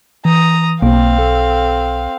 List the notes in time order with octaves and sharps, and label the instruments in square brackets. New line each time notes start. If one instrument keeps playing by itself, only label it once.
[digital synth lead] E3 [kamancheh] A#5 D#6
[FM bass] B1 [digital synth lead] A#3 [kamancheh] C4 F5
[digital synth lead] A4